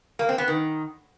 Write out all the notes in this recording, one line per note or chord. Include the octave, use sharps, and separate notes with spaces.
A#3
C4
B3
D#3